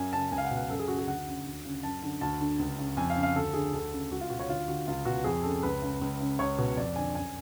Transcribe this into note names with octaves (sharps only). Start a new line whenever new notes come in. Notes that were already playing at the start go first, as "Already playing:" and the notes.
Already playing: F#2 G#5
C#3 A5
C#2 G#5
F5
F#5
B2
F#5
F#2 A4
G#4
C#3 F#4
G#4
D2 F#5
C#3
D2
C#3
F#2 A5
D3
D2 A5
D3
C#2
C#3
F2 G#5
F5
C#3
F5
D2 A4
D3 G#4
D2 A4
C#3
C#2 F#4
F4
B2 F#4
C#5
D2 F4
D3 F#4
C#2 F4
B2 F#4
F2 G#4
C#3 A4
C#2 B4
C#3
C#2
C#3
C#2 C#5
B2
F2 D5
D3 G#5
F#2 G#5